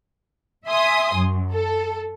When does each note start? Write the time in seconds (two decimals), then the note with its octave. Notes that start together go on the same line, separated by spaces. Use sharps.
0.67 E5 G#5 C6 D#6
1.16 F#2
1.53 A4